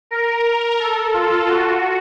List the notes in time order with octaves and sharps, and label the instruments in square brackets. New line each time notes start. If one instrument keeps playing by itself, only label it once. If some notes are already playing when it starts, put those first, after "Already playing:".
[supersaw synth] A#4
A4
F4
F#4